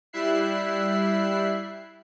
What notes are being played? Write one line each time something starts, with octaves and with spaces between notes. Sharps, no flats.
G3 E4 E5 F#6 C7